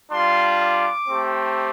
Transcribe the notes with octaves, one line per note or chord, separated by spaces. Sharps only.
G3 D4 F4 C6
D6
A3 C4 G4